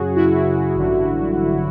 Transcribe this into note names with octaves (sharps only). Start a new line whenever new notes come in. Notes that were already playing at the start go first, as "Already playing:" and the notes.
Already playing: F#2 C#3 F#3 F#4 G#4
E4 F#4
A1 G2 D3 F#3